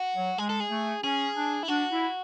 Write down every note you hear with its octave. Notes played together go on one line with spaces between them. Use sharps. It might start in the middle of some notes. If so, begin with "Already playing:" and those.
Already playing: F#4
F#3
G#3 G#4
A4
G#4
A3
C#4 G#4
D4
E4
D4 F#4
E4